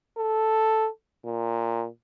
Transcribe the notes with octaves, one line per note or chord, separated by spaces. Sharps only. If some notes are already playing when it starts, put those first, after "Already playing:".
A4
A#2